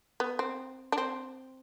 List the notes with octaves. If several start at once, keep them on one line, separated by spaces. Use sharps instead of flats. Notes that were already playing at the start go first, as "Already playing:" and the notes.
B3
C4
D4
C4